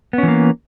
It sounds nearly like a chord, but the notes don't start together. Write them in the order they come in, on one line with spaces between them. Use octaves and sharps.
B3 C#4 E3 A#3